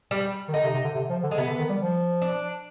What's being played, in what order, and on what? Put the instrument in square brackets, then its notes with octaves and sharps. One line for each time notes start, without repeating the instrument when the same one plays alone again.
[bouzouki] G3
[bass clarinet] D#3
[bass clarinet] D3 [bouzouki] D#4
[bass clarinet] C3
C3
D3
C3
F3
D3
[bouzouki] G#3
[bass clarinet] C3 [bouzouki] B3
[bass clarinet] D3
D#3
G3
F3
[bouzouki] D4